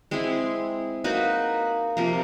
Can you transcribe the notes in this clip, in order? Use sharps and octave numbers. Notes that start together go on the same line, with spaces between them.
G#3 C4 E4 G#4
A#3 D#4 F#4 B4
C3 F3 A#3